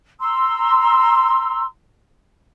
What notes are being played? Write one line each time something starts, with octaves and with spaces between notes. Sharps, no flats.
A#5 C6 E6